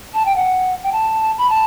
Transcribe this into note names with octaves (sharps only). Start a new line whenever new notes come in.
A5
G5
F#5
G5
A5
B5
A5